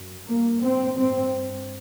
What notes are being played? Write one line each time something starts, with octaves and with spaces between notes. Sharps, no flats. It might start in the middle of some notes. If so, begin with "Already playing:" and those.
Already playing: F#2
G2 A#3
C4
G2 C4